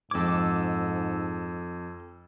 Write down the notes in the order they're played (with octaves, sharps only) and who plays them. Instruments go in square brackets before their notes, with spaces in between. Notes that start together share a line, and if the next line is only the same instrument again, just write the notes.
[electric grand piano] F2 G#6 [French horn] G#2 [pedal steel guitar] A4 D6